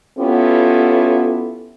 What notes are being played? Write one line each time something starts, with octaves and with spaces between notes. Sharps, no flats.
B3 C#4 E4 F4 G4 A4